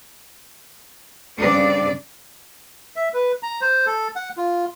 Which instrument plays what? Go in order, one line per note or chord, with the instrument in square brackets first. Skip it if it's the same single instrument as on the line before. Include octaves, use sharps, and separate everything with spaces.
[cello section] G2 C#3 C4 D4 D5
[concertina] E5
B4
A#5
C5
A4
F#5
F4